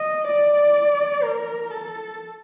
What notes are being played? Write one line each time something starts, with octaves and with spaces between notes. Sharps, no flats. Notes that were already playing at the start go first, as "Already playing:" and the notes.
Already playing: D#5
D5
A#4
A4